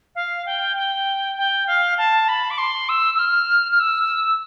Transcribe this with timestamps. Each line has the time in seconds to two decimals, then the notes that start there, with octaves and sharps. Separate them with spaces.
0.15 F5
0.46 G5
0.76 G5
1.36 G5
1.66 F5
1.97 A5
2.28 B5
2.50 D6
2.57 C6
2.88 E6
3.14 E6
3.18 F6
3.71 F6
3.79 E6